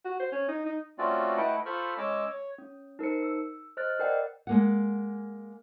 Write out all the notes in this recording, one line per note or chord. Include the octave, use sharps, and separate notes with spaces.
F#4
C5
C#4
D#4
D#4
A3 C4 C#4 F4 F#4 D5
A3 E4 B4 D#5 F#5 G5
F4 A4 C5 B5 C#6 F6
G#3 C#4 C#5 D#5 D6 E6
C#5
C#4
D#4 A#4 C5 C#7
E6
C5 D#5 F6 F#6 A6
A#4 B4 D5 D#5 F#5 G5
G#3 A#3 F#5